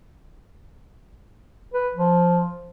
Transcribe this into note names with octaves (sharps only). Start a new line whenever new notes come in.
B4
F3